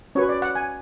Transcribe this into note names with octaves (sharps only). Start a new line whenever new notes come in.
C#4 F#4 B4 C#5
D5
F#5
G#5